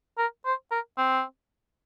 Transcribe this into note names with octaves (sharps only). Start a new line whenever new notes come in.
A#4
C5
A#4
C4